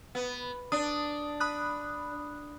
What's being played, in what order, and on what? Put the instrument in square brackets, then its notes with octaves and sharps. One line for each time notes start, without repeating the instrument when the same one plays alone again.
[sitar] B3
[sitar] D4 [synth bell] D#6
[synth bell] B5 D#6 F#6